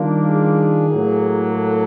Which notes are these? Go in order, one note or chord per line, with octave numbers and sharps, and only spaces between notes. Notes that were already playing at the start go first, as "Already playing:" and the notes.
Already playing: D#3 G3 A#3 D4 F4
G#4
A2 F#3 A#3
A4